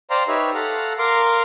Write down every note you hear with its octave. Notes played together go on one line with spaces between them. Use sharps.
C5 D5 F5 G5 A#5 C6
D#4 G4 B4 C#5 E5
A4 F5 F#5 A#5
A#4 F5 A#5 C6 D6